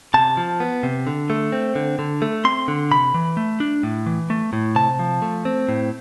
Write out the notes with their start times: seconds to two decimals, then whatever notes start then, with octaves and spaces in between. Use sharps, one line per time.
0.14 C3 A5
0.37 F3
0.60 B3
0.83 C3
1.07 D3
1.30 A3
1.52 C4
1.76 D3
1.99 D3
2.22 A3
2.45 C4 C6
2.68 D3
2.91 C3 B5
3.14 E3
3.37 A3
3.60 D4
3.83 A2
4.06 E3
4.30 A3
4.53 A2
4.76 C3 A5
4.99 F3
5.22 A3
5.45 C4
5.69 A2